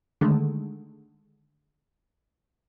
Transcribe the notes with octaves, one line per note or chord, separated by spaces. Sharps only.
D3 D#3 G#3 A3